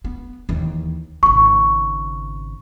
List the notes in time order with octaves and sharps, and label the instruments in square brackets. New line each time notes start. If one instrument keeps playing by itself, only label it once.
[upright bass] B3
D#2 E3
[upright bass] G#1 C#3 [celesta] C#6